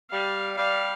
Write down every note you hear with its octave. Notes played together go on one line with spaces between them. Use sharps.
G3 F5
G3 F5